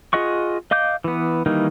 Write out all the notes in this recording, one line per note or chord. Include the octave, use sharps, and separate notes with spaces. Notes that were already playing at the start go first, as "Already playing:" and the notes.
F4 G#4 D#5 F#5 C#6
D#5 F5 D6 G6
E3 B3
D#3 E3 G3 A#3 D#4